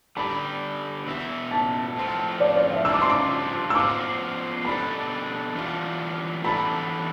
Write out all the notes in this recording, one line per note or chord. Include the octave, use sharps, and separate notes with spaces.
D3 G3 D4 G4 D5 B5
B2 B3 E4 B4 E5
A5
A2 F3 C4 F4
D5
D5
E5
G3 D4 F4 C5 E6
D6
C6
D6
E6
B3 F4 C5 D6
B2 G3 D4 A4 B5
E3 G3 B3 D4 F4
E3 G3 B3 D4 A4 B5